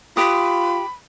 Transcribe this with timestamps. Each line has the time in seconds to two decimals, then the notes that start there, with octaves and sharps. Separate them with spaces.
0.17 F4 G4 B5 D#6